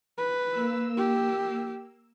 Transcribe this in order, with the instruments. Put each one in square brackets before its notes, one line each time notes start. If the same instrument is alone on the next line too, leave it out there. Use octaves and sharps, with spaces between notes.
[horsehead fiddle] B4
[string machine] A#3 E6
[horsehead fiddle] G4